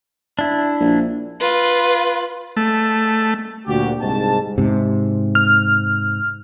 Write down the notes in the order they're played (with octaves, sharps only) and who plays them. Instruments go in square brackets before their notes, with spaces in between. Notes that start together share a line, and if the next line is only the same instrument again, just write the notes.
[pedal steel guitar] D4 E4
[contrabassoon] A#1
[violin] F4 B4
[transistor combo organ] A3
[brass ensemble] D2 A#2 F#4 G4
C2 G#2 A5
[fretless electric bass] G#2 C3
[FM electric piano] F6